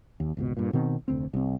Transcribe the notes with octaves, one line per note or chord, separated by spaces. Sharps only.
D#2
G#1 C#2 B2
G2 A#2
B2 D#3 C4
F1 D2 C4
C2 C4